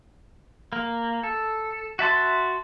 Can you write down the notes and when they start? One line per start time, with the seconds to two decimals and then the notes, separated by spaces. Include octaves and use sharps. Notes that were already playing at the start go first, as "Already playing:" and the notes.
0.73 A#3
1.23 A4
1.99 F#4 E5 A5 C6